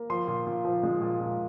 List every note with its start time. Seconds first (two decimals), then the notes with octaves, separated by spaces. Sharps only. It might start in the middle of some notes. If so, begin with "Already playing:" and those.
Already playing: A#3
0.10 F3 C6
0.27 A#2
0.47 A#2
0.65 F3
0.83 G#3
1.01 A#2
1.20 A#2